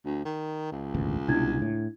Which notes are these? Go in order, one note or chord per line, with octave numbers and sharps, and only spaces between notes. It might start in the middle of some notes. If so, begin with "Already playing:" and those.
D2
D#3
C#2
E1 A1 D2
C2 B2 D4 E4 G#6
A2